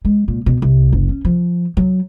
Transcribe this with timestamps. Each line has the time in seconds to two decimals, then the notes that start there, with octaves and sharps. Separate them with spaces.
0.05 G#3
0.28 A#2
0.46 B2
0.62 C2
0.92 F#1
1.09 C#4
1.25 F3
1.77 F#3